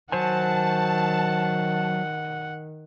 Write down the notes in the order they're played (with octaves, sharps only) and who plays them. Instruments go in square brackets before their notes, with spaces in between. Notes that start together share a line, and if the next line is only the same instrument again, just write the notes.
[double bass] D#3 [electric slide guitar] F#3 C5 G#5 [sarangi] F#5 [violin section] A5